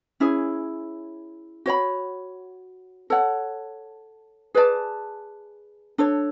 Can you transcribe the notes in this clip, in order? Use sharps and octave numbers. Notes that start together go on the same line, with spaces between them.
C#4 E4 G#4 C#5
F#4 C#5 G#5 B5
A4 C#5 F#5
G#4 B4 D5 A5
D4 A4 C#5